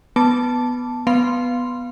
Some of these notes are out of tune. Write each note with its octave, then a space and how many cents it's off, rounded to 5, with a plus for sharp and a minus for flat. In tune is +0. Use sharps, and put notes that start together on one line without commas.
B3 +0 A5 +0 D6 -10
B3 +0 F5 +0 C6 +0